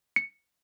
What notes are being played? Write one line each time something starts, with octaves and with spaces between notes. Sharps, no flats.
C#7